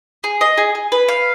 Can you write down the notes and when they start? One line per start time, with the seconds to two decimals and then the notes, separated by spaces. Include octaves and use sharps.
0.24 G#4
0.41 D#5
0.58 G#4
0.75 G#4
0.92 B4
1.09 F5